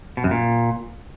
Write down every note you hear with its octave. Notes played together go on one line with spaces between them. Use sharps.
B2
F#2
A#2